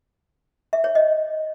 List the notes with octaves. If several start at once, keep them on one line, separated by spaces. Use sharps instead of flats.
E5
C#5
D#5